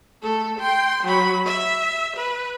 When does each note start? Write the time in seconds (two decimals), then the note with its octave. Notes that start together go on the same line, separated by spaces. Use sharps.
0.22 A3 A4
0.60 G5 C6
1.04 F#3 B5
1.46 E5
2.16 B4